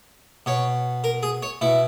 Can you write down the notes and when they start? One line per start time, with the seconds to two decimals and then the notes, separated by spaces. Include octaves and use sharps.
0.46 B2 C#5
1.04 A#4
1.23 G#4
1.43 C#5
1.61 B2 E4